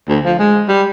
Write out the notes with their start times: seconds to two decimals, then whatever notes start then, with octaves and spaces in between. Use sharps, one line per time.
0.09 D2
0.25 F3
0.39 G#3
0.68 G3